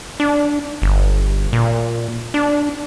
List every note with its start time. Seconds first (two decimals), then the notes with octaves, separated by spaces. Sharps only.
0.20 D4
0.82 G1
1.53 A#2
2.34 D4